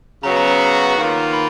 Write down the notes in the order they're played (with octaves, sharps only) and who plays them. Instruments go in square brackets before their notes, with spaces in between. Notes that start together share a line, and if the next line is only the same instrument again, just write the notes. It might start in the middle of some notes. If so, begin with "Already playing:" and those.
[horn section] C#3 F#3 B3 F#4 [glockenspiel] A#5
[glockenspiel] A#5
A#5
A#5
[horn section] D#3 A#3 F4
[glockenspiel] B5